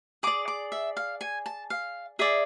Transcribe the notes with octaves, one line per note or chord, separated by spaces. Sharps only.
G#4 D5 D6
D6
E5
F5
G#5
A5
F5
G#4 D5 E5